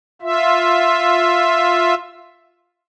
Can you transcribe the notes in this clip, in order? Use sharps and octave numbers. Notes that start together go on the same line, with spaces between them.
F4 E5